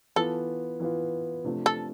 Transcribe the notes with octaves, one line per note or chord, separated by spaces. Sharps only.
E3 B3 F4 A4
E3 B3 F4
C3 F3 A3 D4
A4